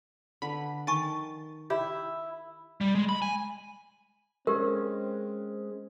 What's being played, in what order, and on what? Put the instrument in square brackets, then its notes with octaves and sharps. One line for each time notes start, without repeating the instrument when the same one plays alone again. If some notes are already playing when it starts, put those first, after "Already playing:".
[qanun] D3 B4 [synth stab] B5
[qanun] D#3 [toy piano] G#5 A5 C#6 [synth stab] A6
[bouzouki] E4 [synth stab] G4
[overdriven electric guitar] G3
G#3
B5
G#5
[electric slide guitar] G#3 C#4 [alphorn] C4 [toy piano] G4 A#4